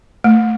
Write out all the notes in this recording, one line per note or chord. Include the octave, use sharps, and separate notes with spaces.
A3